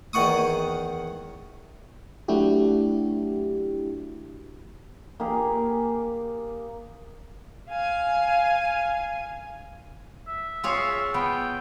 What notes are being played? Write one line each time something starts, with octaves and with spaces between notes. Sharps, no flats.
E2 D#3 F#5 C#6 D#6
F#3 A3 D4 E4 F#4 G4
A#3 G4 G#4
F5 G#5
E5
F4 G#4 C#5
B3 G5